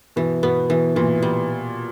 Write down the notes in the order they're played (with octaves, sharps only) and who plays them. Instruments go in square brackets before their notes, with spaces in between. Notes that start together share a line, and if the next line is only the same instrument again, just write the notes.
[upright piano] B2 [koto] E3
[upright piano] B2 [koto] B3
[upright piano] B2 [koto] E3
[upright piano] A#2 [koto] E3
[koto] G3